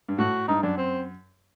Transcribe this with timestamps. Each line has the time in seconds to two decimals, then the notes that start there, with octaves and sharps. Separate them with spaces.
0.09 G2
0.18 A2 F#4
0.48 G2 D#4
0.63 F#2 D4
0.77 C4